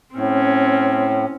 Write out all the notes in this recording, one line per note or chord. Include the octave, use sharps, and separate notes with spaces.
A2 C4 C#4